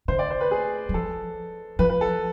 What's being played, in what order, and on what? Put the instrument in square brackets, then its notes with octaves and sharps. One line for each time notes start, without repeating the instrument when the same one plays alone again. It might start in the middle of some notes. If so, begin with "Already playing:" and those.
[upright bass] D3 [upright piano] C5
[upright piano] D5
C5
B4
G#4
[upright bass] G#3
[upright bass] F3 [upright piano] A4
[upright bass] F3 [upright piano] B4
[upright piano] B4
A4